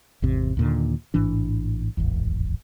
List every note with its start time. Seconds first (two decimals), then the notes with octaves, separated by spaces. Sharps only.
0.22 G#1 E2 C3
0.57 D#2 A#2 D3
1.14 A1 G#2 E3 D4
1.97 D1 G#1 E2